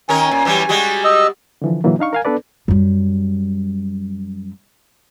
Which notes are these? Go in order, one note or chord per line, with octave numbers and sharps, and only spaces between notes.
D#3 C#4 A#4 G#5
A#2
E3 F#3 G3
G3 G#3 F#4
D#5 E6
D3 E3 F3
A#2 D3 E3 F#3 A#3
D4 D#4 F5 C#6
A#4 F5 G#5
B3 D4 A4 B4 D5
F#2 G3